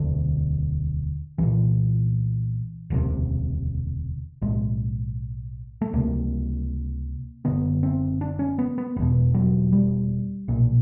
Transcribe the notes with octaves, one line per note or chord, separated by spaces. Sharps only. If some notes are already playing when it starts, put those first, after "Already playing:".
Already playing: E1 D2 D3
C2 A#2 E3
E1 D2 C3
B1 A2 G#3
A3
C#2 C3 A#3
F#1 F2 D3 B3
C4
D4
C#4
B3
B3
F1 E2 B2 B3
F#3
G3
B1 A#2